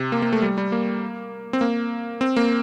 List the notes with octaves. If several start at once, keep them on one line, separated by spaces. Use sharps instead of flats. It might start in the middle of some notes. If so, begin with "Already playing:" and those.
Already playing: C3
A#3
A#3
A3
G3
G3
A#3
C4
A#3
C4
A#3